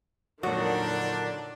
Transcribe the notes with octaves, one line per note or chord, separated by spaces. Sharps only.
F2 A#2 D3 D#3 F#3 D4 F#4